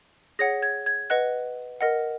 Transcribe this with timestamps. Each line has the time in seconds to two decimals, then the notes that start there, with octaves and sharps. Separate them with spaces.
0.39 G#4 C#5 F#5 A#6
0.63 G#6
0.86 G#6
1.10 B4 D#5 F#5 F#6
1.81 A#4 D#5 F#5